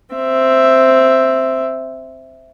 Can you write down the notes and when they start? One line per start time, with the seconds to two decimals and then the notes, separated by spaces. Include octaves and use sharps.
0.15 C4 E5